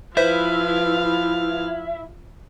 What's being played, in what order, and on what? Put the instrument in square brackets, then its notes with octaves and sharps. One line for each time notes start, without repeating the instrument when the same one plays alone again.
[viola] F3 F5 [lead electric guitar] E4 [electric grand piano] B4 [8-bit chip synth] C5 E5